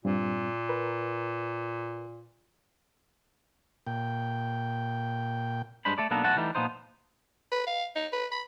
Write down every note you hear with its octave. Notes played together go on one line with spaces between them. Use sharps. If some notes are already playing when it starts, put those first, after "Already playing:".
G2 A#2 C4
A#4 B4
A#2 G5
G2 G#3 D4 C5 B5
A3 A4 D5
B1 A#3 B3 D4 A4 A#5
B1 A2 E3 F#4 F#5 A5
E3 G3 A3 D#4
A#2 E3 F3 B3 D#4 C5
B4
F5
D#4
B4
B5